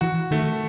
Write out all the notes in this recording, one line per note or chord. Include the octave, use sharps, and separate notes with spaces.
E3 F#4
D#3 A3